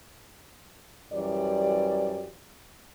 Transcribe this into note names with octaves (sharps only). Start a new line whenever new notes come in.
F#2 E3 G3 D5